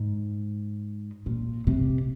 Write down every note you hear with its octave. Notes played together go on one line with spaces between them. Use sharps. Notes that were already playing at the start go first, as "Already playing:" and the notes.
Already playing: G#2
A#2
C3